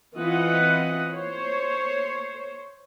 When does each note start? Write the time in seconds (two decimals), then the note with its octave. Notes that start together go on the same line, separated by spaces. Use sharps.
0.14 E3 C4 F4 B4 D#5 F#5
1.09 C5 C#5